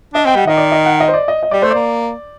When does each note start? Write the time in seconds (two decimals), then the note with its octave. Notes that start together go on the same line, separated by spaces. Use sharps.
0.14 D4 D#5
0.25 C4 G5
0.35 G3 F#5
0.47 D#3 D#5
0.57 D5
0.72 D#5
0.85 F#5
1.00 D#5
1.08 C5
1.14 D5
1.28 D#5
1.43 D#5
1.51 G3 D5
1.62 A3 C5
1.71 A#3 D5